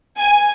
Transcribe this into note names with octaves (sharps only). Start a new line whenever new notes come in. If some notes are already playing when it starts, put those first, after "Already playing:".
G#5